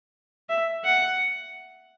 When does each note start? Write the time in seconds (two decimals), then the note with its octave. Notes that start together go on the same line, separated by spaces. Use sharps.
0.49 E5
0.84 F#5